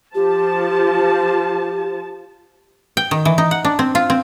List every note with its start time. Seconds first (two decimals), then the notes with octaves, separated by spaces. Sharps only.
0.15 F3 G4 A5
2.97 G5
3.11 D#3
3.25 E3
3.38 D#4
3.51 F#5
3.65 D4
3.79 C4
3.95 F4
4.10 C4